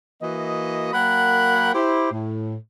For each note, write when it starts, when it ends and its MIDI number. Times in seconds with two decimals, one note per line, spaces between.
0.22 0.91 52
0.22 0.91 58
0.22 0.91 66
0.22 0.91 75
0.93 1.71 54
0.93 1.71 58
0.93 1.71 70
0.93 1.71 78
0.93 1.71 79
0.93 1.71 83
1.74 2.11 64
1.74 2.11 67
1.74 2.11 72
2.12 2.55 45